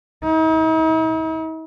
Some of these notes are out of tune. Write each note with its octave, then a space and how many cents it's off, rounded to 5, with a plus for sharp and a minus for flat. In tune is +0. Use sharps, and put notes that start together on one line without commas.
D#4 +45